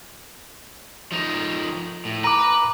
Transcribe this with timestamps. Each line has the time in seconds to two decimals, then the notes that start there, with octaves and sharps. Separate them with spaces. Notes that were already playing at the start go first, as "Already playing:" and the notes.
1.12 F3 D#4
2.05 A2
2.24 B4 A#5 D6